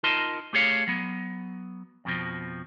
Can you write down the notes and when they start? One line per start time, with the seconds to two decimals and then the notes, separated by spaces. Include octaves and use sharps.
0.03 D#4 F4 A#4 D#5 A5 C6
0.53 A3 G4 G#4 C#5 F5
0.87 F#3 B3
2.05 F2 B2 F3